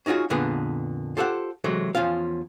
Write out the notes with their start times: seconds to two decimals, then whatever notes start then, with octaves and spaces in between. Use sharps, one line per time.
0.06 C#4 D#4 F4 F#4 G#4
0.30 F2 A#2 D3 B3 G#4 B4
1.17 F4 G4 A4 C5 F5 F#5
1.64 C3 E3 F#3 G#3 A3
1.95 E2 F3 C#4 F4 F5